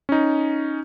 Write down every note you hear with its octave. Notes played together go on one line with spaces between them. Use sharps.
C#4 D#4